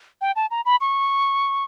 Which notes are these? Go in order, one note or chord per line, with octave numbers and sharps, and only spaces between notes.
G5
A5
A#5
B5
C#6